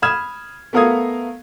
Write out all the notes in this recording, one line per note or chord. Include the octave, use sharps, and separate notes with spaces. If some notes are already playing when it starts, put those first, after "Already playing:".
B5 D#6 F6 G#6 E7
A3 B3 A#4 F5 D#6 G#6